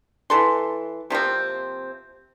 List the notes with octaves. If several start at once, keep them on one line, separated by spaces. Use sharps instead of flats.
E3 A4 C6
C3 F3 A#3 C4